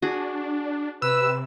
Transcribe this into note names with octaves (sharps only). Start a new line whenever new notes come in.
D4 F#4 G#4
C3 B4 E6